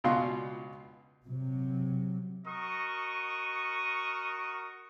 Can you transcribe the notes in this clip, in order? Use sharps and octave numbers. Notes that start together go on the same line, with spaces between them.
C#2 B2 D4 F4 C6
C3 F#3
F#4 A#4 D#5 C#6 D#6